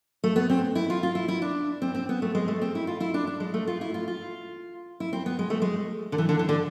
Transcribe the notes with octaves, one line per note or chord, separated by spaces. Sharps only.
A3
B3
C4
E4
F4
F4
E4
E4
D4
C4
C4
B3
A3
G#3
A3
C4
E4
F4
E4
D4
D4
G#3
A3
F4
E4
F4
F4
E4
C4
B3
G#3
A3
G#3
D3
E3
D3
E3
D3